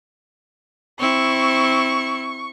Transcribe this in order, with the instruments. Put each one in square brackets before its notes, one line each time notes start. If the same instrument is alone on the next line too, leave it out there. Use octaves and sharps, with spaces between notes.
[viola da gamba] C4 E4 [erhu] C#6